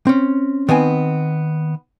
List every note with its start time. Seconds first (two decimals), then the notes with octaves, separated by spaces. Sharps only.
0.07 C4 C#4
0.69 D#3 B3 C4 G#5